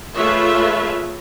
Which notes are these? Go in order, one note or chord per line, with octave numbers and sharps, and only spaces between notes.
A3 F4 G#4 B4 C#5 E5